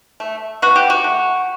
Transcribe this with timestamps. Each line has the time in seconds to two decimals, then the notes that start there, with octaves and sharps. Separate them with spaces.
0.20 A3
0.62 B2 F#4
0.76 G4
0.90 F#4
1.04 A3